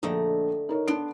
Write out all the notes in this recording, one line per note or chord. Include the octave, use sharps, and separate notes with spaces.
A#1 D3 A3 D#4
D#4 A#4 C#5
B3 D4 C6 D7